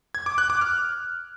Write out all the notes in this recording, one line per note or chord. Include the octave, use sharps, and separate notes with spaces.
G#6
D6
F#6
D6
F6